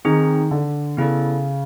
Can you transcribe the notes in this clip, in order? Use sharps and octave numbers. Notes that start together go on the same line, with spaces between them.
D#3 C4 D#4 G#4
D3
C#3 B3 E4 A4 D5